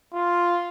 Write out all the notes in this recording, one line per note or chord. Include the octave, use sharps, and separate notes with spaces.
F4